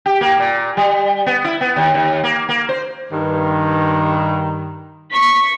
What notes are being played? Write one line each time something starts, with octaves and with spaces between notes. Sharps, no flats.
G4
A#3
A#2
G3
B3
E4
B3
D#2
D#2
A#3
A#3
C5
G2 D#3
C#6 B6